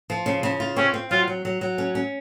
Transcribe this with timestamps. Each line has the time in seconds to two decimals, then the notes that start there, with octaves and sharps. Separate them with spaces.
0.10 F3
0.26 C#3
0.43 C#3
0.60 F4
0.76 C4 C#4
0.94 C4
1.11 F#3 F4
1.28 F#3
1.45 F#3
1.61 F#3
1.78 C#4
1.95 C#4